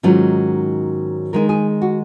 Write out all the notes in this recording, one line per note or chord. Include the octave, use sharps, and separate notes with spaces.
G#2 D#3 F#3 C#4 F4
D#3 G#3 D#4 A#4
G#4
F#4